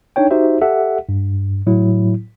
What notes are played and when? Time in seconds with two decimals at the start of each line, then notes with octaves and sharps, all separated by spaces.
0.16 D4 D#4 C#5 G5
0.31 D#4 F#4 G4 C5 E5
0.61 G4 A4 E5 F#5
1.09 G2
1.67 A2 F#3 E4